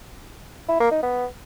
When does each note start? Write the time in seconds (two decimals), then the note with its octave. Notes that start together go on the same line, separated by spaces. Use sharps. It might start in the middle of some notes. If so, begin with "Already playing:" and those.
0.69 E4
0.80 A#3
0.91 D#4
1.03 B3